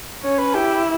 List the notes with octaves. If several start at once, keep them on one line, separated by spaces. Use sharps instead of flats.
C#4 C#5
B4
E4 G4